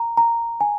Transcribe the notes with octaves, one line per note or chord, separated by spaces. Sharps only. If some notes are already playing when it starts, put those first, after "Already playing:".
Already playing: A#5
A#5
G#5